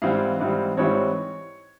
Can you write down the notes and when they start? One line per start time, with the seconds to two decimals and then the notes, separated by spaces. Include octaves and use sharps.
0.02 G#2 E3 G3 C4 F5
0.39 G#2 E3 G3 C4
0.77 G#2 E3 G3 C4 C#5